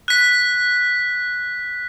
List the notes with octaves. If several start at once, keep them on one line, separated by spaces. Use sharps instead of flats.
F#6 B6